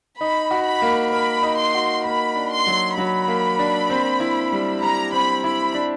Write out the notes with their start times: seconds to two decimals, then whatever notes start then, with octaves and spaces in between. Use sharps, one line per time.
0.21 D#4 B5
0.51 F#4
0.66 B5
0.82 A#3
1.12 A#4 B5
1.43 D#4
1.59 C6
1.74 F#4
2.05 A#3 B5
2.36 D4
2.51 C6
2.67 F#3
2.97 F#3 B5
3.28 A#3
3.59 D4
3.90 C4
4.20 E4
4.52 G3
4.82 G3 A#5
5.13 C4 B5
5.43 E4 B5
5.74 D4